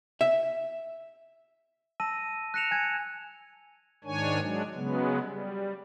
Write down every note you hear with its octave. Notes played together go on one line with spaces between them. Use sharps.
E5
A5 E6 A#6 D#7
F#6 A#6 C#7 E7 F7
G#5 G#6 C#7
G#2 D#3 D4 C#5 G#5
F#3 G#3 D4
C#3 F#3 G#3 B3
G3